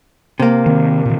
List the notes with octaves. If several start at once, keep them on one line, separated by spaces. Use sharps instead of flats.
C3 A#3
D#3 C4
A#2 D#3